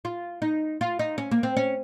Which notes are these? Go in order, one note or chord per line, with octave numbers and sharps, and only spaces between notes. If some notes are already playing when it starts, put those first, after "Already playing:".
F4
D#4
F4
D#4
C#4
A#3
C4
C#4